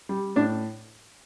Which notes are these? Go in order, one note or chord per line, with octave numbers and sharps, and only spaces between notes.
G3
A2 D4